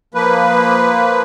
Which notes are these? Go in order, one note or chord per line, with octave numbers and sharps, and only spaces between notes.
F3 A#3 B4